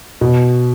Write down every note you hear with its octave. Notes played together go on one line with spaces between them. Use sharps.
B2